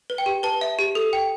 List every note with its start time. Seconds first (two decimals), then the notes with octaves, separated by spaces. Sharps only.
0.10 B4
0.18 G5
0.26 G4
0.43 B4 A5
0.61 E5
0.79 G4
0.95 A4
1.13 G5